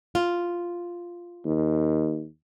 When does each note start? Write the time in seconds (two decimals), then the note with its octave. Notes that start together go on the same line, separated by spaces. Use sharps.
0.15 F4
1.46 D#2